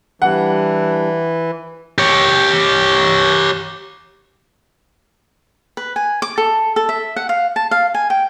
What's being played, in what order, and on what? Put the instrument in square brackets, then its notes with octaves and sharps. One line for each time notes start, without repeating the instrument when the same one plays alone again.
[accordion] E3 [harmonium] G3 D4 [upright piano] F#5
[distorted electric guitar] G4 C#5
[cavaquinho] B4
G#5
D6
A4
A4
E5
F#5
F5
A5
F5
G#5
G5